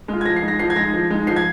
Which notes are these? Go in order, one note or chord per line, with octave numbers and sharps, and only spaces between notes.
G#3 F4
G#6
F3 A#6
C7
G#3 D#4
A#6
F3 C7
G#6
G#3 D#4 A#6
F3
G#3 D#4
F3 C7
G#6